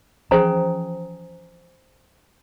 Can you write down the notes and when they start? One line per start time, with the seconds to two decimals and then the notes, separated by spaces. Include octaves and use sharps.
0.31 E3 F3 C#4 G#4 C5 G5 A#5